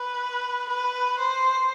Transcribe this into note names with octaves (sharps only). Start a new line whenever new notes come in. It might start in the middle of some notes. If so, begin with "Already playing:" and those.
Already playing: B4
B4
C5